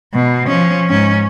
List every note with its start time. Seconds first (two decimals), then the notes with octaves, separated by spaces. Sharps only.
0.14 B2
0.47 F3 C#4
0.89 G#2 C#4